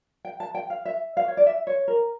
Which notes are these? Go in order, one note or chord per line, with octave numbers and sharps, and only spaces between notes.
G5
A5
G5
F5
E5
F5
C#5
D5
E5
C#5
A#4